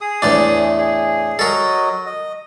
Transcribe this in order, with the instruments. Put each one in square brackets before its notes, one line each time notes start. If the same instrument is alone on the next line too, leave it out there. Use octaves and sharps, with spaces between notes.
[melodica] G#4 D#6
[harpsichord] E2 A2 D4
[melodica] G#4
[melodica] F#3 D#5 [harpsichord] A4 A#4
[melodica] D#5